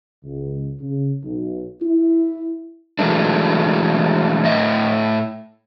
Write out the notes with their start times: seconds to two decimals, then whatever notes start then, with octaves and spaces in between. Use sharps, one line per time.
0.24 C#2
0.80 C#3
1.22 B1
1.82 E4
2.99 E3 F#3 G#3 A3 D4
4.45 A2 D#5 E5